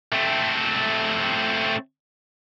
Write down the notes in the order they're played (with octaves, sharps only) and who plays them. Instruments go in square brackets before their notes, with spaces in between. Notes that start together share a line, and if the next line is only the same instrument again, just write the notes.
[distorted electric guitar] A3 C4